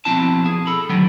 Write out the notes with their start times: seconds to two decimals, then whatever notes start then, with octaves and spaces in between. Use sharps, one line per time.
0.05 B2 F3 C4 E4 A5
0.46 G#4
0.67 A4 B5
0.90 A2 D3 D#3 F#3 G3